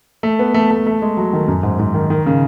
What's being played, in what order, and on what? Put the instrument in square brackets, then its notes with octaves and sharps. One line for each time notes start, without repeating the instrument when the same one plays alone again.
[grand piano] A3
B3
A3
A3
A3
G#3
F#3
D#3
F#2
G#2
G#2
D#3
D#3
C#3